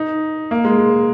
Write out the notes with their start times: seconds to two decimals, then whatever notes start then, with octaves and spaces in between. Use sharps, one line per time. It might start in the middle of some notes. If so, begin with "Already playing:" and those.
Already playing: D#4
0.51 A#3
0.65 G#3
0.78 G#3